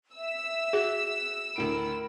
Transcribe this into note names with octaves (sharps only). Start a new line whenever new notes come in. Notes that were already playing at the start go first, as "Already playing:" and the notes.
E5 E6
F#4 G#4
D2 A2 A#4 B5 D7